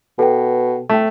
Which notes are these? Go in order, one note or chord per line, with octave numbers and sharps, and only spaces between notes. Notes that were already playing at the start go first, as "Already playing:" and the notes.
B2 A4 B4 G5
A3 G5 A5